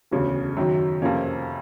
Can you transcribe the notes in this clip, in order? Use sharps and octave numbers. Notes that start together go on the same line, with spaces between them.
E1 D2 C#3
F#2 D#3 F#3
F2 C3 F3 A#3 C#4